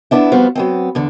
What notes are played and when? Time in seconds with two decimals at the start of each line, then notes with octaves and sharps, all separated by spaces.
0.11 B3 D4 E4
0.32 F3 G3 B3 C4 F4 F#4
0.55 F#3 B3 C4
0.95 E2 D3